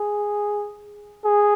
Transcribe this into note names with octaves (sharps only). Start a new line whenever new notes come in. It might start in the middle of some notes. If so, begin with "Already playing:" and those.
Already playing: G#4
G#4